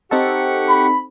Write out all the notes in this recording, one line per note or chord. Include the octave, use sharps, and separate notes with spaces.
C4 D#4 G4 A4 F#5 C#6
B5